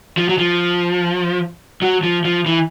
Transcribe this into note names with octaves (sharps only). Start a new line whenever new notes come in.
F3
F#3
F3
F#3
F3
F3
E3